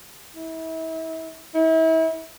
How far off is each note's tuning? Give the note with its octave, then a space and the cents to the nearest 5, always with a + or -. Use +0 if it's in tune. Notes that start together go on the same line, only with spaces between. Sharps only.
E4 -35
E4 -35